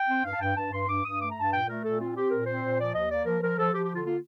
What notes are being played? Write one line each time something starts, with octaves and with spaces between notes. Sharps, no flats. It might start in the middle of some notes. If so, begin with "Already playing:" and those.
Already playing: G5
C4
G2 F5
A5
G2 G5
G2 A5
G2 C6
G2 D6
G2 D#6
A3 D6
G2 A#5
A5
A#2 G5
A3 A#4
A#2 A4
C4 F4
C4 G4
A#2 A#4
C4 C5
A#2
F3 D5
D#2 D#5
A#3 D5
F3 A#4
F3 A#4
F3 A4
F3 G4
G4
D3
F4
A#3 F4